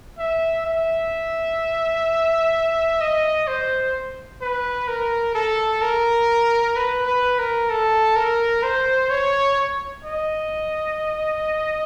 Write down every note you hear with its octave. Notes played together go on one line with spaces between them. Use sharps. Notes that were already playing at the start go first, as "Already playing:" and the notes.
E5
E5
D#5
C5
B4
A#4
A4
A#4
B4
B4
A#4
A4
A#4
C5
C#5
D#5